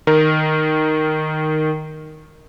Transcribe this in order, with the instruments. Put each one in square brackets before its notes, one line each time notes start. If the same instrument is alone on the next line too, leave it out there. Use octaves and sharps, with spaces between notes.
[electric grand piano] D#3 A#4